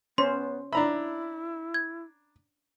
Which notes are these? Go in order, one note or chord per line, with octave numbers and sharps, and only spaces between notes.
B3 C#4 C5 C6
D4 E4 E5 A#5 B5
G#6